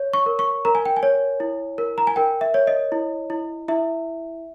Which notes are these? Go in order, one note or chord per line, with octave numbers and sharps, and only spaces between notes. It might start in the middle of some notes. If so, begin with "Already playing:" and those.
Already playing: C#5
C#6
A#4
C#6
A#4 A#5
G#5
G5
G#5
C#5
E4
A#4
A#5
G#5
A#4 G5
E5
C#5
D#5
E4
E4
E4 E5